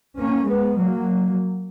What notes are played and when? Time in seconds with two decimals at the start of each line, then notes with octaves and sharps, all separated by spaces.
0.17 A#3 C#4
0.47 G#3 B3
0.77 F#3 A#3